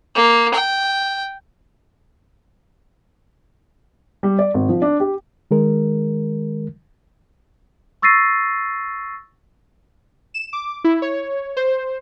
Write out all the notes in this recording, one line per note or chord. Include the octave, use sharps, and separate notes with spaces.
A#3
G5
G3
D5
G#1
F3
D4
G4
D#3 G#3 A#4
C#6 E6 A6 A#6 C7 D#7
E7
D6
E4
C#5
C5